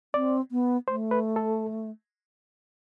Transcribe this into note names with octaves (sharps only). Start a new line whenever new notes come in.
C4 D5
B3
A3 C5
B4
A4